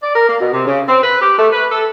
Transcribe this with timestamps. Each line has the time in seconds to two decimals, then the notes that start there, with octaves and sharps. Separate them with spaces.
0.02 D5
0.14 A#4
0.28 A#3
0.40 B2
0.53 C3
0.66 C#3
0.89 C4
1.02 B4
1.21 G4
1.38 A3
1.52 B4
1.71 A4